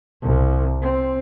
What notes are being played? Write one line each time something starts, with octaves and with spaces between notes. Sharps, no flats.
C2
C4